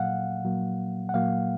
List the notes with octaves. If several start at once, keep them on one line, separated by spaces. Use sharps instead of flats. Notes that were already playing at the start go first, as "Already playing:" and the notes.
Already playing: A#2 F#3 A#3 F5 F#5
A#2 F#3 A#3
F#5
A#2 F#3 A#3 F5